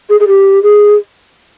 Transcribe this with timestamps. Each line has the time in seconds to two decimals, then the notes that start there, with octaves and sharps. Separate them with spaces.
0.09 G#4
0.20 G#4
0.27 G4
0.62 G#4